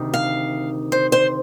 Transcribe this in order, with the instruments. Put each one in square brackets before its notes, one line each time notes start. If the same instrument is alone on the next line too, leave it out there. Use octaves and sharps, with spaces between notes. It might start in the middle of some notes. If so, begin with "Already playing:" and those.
Already playing: [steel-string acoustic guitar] D2 C3 D#3
F5
C5
C5